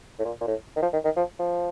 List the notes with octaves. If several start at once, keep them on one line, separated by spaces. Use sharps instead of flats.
A2
A#2
A#2
A2
D#3
F3
D#3
D#3
F3
F3